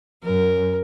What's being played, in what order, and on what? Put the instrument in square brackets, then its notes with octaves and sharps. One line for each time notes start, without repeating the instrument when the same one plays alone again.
[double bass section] F#2 [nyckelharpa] A#4